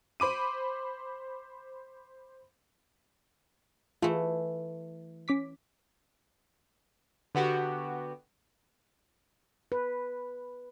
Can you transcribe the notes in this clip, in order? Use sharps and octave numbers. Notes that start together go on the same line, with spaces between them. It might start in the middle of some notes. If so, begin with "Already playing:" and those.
C5 B5 D6 D#7
E3 A3 F4 G#4
C#4 D6 B6
D3 B3 F#4 G4
B4